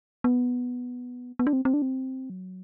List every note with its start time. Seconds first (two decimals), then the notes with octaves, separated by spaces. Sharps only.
0.24 B3
1.39 B3
1.47 D4
1.53 C4
1.65 C4
1.74 D4
1.82 C4
2.30 F#3